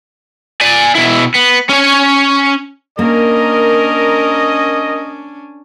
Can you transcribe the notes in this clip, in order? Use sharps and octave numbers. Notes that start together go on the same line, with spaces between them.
D5 G#5
B2 E4
B3
C#4 C#5
A#3 C#4 D4 A#4 D#5